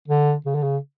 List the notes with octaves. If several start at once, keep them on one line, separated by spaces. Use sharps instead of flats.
D3
C#3
D3
C#3